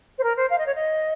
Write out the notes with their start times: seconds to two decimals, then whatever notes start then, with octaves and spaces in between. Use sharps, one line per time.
0.18 C5
0.23 A#4
0.36 C5
0.50 F5
0.58 D#5
0.66 C#5
0.74 D#5